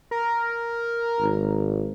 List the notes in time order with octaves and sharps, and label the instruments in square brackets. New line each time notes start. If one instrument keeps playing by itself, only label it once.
[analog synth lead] A#4
[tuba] G#1